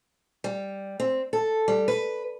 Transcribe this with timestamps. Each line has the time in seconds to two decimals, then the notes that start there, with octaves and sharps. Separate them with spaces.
0.44 G3
1.00 C4
1.33 A4
1.68 G3
1.88 B4